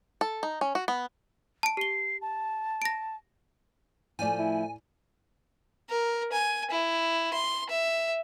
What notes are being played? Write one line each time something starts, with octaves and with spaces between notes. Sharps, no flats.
A4
D#4
C#4
F#4
B3
A5 D7
G4 C7 G7
A5
A#6 D7
A2 F3 A3 D5 G#5
E4
A#4
G#5
E4
C6
E5